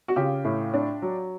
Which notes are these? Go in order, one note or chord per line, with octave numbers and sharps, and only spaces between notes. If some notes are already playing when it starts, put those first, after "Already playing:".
F#4
C#3 F4 G4
A2
D4
F#3